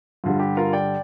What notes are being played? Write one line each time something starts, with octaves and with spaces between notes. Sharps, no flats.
G2 D3 G3 F4
G4
F4 A#4
D5 G5